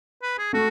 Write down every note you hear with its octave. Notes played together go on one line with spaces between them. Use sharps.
B4
G#4
A3 F#4